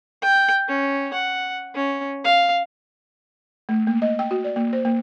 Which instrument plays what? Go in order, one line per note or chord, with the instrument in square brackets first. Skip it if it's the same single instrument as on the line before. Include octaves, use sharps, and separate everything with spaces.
[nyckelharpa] G5
C#4
F#5
C#4
F5
[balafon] A3
A#3
D#5
G5
F#4
D5
A#3
C5
A#3